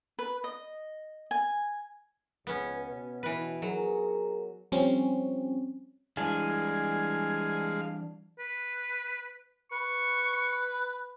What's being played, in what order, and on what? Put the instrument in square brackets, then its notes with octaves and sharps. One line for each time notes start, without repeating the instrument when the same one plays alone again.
[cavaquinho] B4
D#5
G#5
[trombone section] C#2 [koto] B3 C#4
[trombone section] B2
[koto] E3 B4
[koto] F#3 [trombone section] G#4 A#4
[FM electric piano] F3 G3 C4 C#4
[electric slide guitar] E3 G3 D4 [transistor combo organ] G#3 F5 [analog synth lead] G#5
[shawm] B4
[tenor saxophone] B4 [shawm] C#6